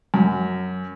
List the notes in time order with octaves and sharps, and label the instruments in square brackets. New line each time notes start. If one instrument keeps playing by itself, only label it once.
[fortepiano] F#2